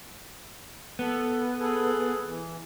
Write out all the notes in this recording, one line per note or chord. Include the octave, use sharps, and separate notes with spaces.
B3 A4
G#4 A4 B4
E3